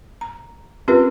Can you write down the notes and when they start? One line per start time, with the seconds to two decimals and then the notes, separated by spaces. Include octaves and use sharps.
0.21 A#5
0.88 C4 C#4 F4 G4 A#4 B4